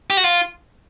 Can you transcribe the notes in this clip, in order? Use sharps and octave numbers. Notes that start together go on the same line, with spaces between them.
G4
F#4
F4